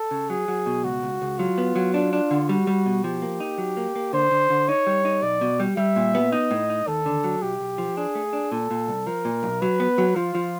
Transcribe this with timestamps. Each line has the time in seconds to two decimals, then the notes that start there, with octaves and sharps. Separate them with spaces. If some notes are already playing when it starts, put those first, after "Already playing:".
Already playing: A4
0.11 C#3
0.30 F#3 G#4
0.48 F#3
0.66 B2
0.84 C#2 F#4
1.03 C#2
1.22 C#2
1.39 F#3 F4
1.58 B3
1.76 F#3
1.94 D4 F4
2.13 D4
2.31 D3
2.49 G3 F#4
2.67 G3
2.86 B2
3.04 F3 G4
3.22 A#3
3.40 D#4
3.58 F#3
3.77 A#3
3.96 A#3
4.13 D3 C5
4.31 D3
4.50 D3
4.68 D#4 C#5
4.87 G3
5.05 D#4
5.22 B1 D5
5.41 B2
5.60 G3
5.77 G3 E5
5.96 A#2
6.15 B3
6.32 D#4 D#5
6.51 A2
6.70 D#4
6.88 D#2 A4
7.06 D3
7.24 F#3
7.42 B1 G4
7.61 B1
7.78 F3
7.97 D4 G#4
8.15 A3
8.33 D4
8.52 A#2 A4
8.71 A#2
8.88 C2
9.07 F3 A#4
9.25 A#2
9.43 B1
9.61 F#3 B4
9.80 B3
9.98 F#3
10.16 F3 F4
10.35 F3